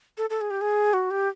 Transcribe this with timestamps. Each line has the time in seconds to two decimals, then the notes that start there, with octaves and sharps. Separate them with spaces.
0.18 A4
0.30 A4
0.41 G#4
0.51 G4
0.61 G#4
0.93 F#4
1.11 G4